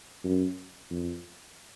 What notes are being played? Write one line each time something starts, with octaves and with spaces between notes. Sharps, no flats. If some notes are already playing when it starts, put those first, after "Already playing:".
F#2
F2